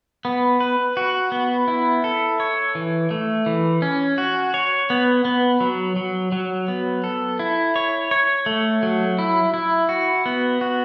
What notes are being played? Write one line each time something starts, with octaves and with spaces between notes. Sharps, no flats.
B3
B4
F#4
B3
E4
A4
C#5
E3
A3
E3
C#4
F#4
C#5
B3
B3
F#3
F#3
F#3
B3
A4
E4
C#5
C#5
A3
F#3
E4
E4
F#4
B3
F#4